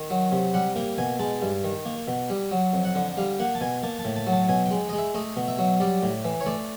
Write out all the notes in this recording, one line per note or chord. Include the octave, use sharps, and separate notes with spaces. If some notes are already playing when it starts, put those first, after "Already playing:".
Already playing: D#3
F#3
C3
G3 F#5
A#3 G5
B2 G#5
G#3 A5
G2
D#3
A#3
B2
G3
F#3
F2
F#5
D3
G3 F5
A#3 F#5
A5
B2 G#5
A#3 A5
A5
A2
A5
F#3
A5
B2 G#5
G#3 G5
D#5
G#3
E5
A3 D#5
B2
E5
F#3
G3 D5
A2
E3
C#5
A3 D5